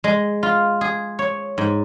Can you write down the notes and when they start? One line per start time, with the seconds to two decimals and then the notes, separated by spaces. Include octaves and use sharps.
0.04 G#3
0.43 F4
0.81 G#4
1.19 C#5
1.58 G#2